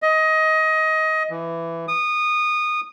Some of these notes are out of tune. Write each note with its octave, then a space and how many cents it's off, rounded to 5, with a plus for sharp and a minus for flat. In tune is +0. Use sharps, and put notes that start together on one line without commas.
D#5 +20
E3 +15
D#6 -20